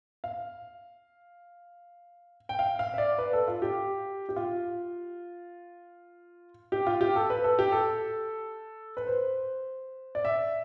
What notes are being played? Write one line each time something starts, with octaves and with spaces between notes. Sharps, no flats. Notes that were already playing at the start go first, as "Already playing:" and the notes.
F5
G5
F5
F5
E5
D5
B4
A4
F4
G4
G4
F4
G4
F4
G4
A4
B4
A4
G4
A4
B4
C5
D5
E5